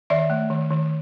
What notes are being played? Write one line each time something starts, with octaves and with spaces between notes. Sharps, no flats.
D#3 D5 E5
A3
D#3
D#3